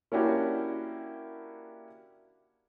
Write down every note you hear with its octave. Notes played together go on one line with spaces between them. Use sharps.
A#3 C#4 D4 E4 F#4 G4